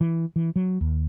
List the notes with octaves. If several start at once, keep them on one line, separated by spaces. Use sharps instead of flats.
E3
E3
F#3
D#2